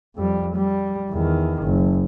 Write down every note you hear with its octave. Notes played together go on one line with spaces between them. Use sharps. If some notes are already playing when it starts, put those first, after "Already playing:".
F2 G3
G3
E2 D#3
F#1